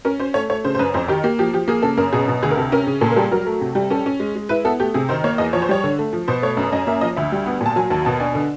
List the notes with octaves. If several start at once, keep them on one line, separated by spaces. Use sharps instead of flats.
C#4 A#4
C#4 C5
A3 C#5
A3 C#5
C#3 C5
C5
F#2 B4
F2 C5
D#3 G4
A#3 G4
F3 G4
F3 G4
A#3 G#4
C#3 A4
F#2 A#4
B2 G#4
B2
D2 G#4
A#4
C3 A4
C#4 A#4
C#3
A#2 A4
A#4
G3 A4
F#3 A#4
A3
C3
G3
C#4 A4
C#4
G#3
G#3
E4 B4
B3 A4
A3 G4
C3 G#4
D#3 C5
A#3 C#5
E2 D#5
F3 C#5
C5
G3 C#5
D3
A3
F3
B2 C5
A3 C#5
F#2
F#2 D#5
A#3 E5
F3 D#5
D2 E5
G3
B3
A#2
A5
F#3 G#5
D#2 A5
B2 A5
D4 G#5
D3